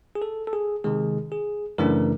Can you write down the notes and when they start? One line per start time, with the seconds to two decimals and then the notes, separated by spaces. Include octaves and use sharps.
0.15 G#4
0.22 A4
0.47 A4
0.53 G#4
0.84 C3 D#3 G#3 G#4
1.32 G#4
1.78 F#2 C#3 E3 A3 D4 A#4